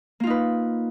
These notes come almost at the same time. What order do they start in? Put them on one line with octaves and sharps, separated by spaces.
A#3 F4 D#4 B4